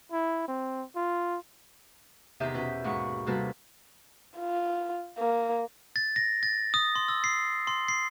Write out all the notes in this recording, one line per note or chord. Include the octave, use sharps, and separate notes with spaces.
E4
C4
F4
E2 C3 D#3 G4 E5 G6
B2 C#4 B4 G6
D#2 G#2 F#5 C#6
C3 G3 A#3 F#4 A4 B4
F4
A#3
A6
A#6
A6
D#6
C6
E6
C7
C6
C7